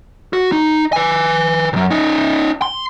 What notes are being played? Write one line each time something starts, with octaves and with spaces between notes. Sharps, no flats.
F#4
D#4
B4 G#5
C2 F#2
C#4 D#4
C6